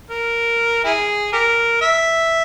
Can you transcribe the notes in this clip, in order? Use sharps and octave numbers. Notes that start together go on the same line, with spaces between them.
A#4
E4 G#4
G4 A#4
E5